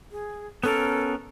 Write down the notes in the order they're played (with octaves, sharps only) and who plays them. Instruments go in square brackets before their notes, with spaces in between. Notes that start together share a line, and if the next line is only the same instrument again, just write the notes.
[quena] G#4
[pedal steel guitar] B3 C#4 A#4 [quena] A4